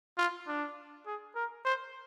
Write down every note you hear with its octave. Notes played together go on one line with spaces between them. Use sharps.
F4
D4
G#4
A#4
C5